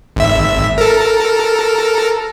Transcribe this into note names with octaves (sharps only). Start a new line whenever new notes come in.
G#1 E5
A4 A#4